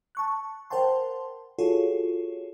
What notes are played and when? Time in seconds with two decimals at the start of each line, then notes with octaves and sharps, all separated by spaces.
0.15 A5 C#6 F#6
0.70 A#4 C5 F#5 G5 A5 C6
1.59 F4 F#4 G#4 A4 C#5